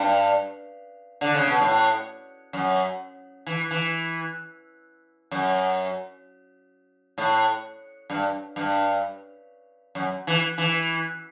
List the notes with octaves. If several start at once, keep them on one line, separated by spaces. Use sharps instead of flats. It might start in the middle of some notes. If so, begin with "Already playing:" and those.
Already playing: G2
D3
C#3
B2
A2
F#2
E3
E3
F#2
A2
G2
G2
F#2
E3
E3